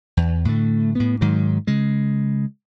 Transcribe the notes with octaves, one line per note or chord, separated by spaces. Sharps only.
E2
A2 D3 A3
A2 B3
G#2 D#3 F#3
C#3 G#3